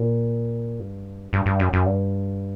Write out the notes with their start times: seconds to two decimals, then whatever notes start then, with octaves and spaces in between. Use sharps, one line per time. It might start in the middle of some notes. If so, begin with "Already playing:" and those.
Already playing: A#2
0.80 G2
1.33 G2
1.46 G2
1.59 F#2
1.73 F#2
1.86 G2